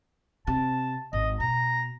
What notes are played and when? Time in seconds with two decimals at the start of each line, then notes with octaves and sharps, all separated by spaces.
0.47 C3 A5
1.13 G#1 D#5
1.40 B2 A#5